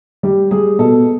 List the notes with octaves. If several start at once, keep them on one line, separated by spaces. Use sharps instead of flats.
G3 G4
G3 G#4
B2 A4